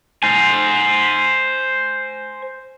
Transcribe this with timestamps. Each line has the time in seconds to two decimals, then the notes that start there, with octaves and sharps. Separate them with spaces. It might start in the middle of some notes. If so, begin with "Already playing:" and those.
0.23 C5 G#5